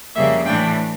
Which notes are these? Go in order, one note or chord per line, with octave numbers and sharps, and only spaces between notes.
F2 C#3 G3 A#3 E5
A2 E3 A3 D4 G5